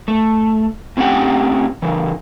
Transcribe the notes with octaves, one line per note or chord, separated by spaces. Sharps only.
A3
A2 C4 C#4 G4 F#5 G5
C#3 E3